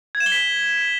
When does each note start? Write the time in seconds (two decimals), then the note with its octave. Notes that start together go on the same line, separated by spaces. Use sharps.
0.15 G#6
0.20 E7
0.26 G7
0.32 B6